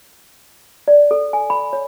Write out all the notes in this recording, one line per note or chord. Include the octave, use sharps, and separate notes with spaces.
D5
A4
G#5
B5
C#5